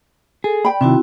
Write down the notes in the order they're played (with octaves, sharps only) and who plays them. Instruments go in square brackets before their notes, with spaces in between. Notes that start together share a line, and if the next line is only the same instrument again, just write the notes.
[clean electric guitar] G#4 [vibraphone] A4
[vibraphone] D5 [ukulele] G5 B5
[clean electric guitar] C3 D#3 [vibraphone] C4 E4 F#4